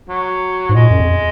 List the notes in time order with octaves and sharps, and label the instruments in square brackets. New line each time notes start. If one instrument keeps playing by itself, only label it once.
[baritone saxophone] F#3
[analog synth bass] G#2
[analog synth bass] A#2 [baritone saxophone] G#3
[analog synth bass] F#2
F2